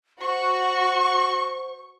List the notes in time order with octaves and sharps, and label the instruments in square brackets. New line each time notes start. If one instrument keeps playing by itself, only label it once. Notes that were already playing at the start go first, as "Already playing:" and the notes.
[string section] F#4 [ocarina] C5 [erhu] C#6